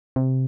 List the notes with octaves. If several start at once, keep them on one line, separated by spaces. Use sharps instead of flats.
C3